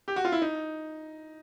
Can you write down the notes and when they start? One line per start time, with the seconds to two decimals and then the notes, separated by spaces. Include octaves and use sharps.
0.08 G4
0.16 F#4
0.25 F4
0.32 E4
0.42 D#4